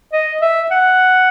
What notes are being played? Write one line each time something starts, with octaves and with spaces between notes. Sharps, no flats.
D#5
E5
F#5